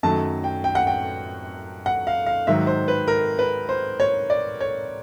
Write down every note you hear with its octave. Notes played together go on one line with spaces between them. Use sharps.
F#2 D#3 F#3 A3 A5
G5
G5
F#5
G5
F#5
F5
F5
G#2 D#3 F#3 E5
C5
B4
A#4
B4
C5
C#5
D5
C#5